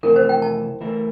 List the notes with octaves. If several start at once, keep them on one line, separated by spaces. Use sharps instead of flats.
F2 C3 E3 A3 E4 A#4
C5
G5
A5
E3 A3 E4 A#4